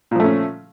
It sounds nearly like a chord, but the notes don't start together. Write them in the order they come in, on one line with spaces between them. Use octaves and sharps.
A#2 F3 A3 C#4